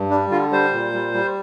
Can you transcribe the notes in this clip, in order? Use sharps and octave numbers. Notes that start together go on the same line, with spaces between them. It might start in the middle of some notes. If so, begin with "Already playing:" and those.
Already playing: G2
G3 D4
D3 F4
G3 C5
A#2
G3
G3